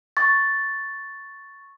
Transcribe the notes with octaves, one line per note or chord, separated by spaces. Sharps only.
C#6 A6